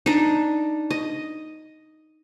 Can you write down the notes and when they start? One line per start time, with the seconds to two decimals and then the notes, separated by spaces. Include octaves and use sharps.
0.06 D4 D#4
0.90 D#5